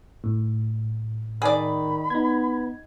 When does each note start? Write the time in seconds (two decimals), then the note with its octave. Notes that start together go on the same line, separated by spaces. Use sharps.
0.24 A2
1.42 D#3 G#4 D5 B5
2.10 B3 D#4 G#6